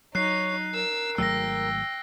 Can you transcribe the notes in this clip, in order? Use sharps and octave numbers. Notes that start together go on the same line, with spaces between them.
F#3 D#4 C#5 F#6 C7
A#4 E6
G#1 F#3 A3 G5 E6 A#6